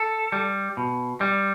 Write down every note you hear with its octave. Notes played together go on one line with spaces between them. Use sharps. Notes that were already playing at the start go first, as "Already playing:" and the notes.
Already playing: A4
G3
B2
G3